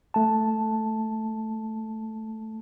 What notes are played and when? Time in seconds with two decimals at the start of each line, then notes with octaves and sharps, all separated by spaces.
0.14 A3 A5